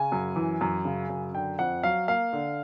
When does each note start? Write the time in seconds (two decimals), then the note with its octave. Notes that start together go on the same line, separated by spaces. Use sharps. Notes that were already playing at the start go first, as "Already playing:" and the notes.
Already playing: C#3 G#5
0.12 F#2
0.36 E3
0.61 F#2
0.85 C#3
1.10 F#2
1.35 D3 G5
1.59 F2 F#5
1.83 F#3 F5
2.08 A#3 F5
2.33 D3